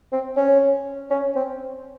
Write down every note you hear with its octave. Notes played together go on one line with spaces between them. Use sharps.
C4
C#4
C#4
C4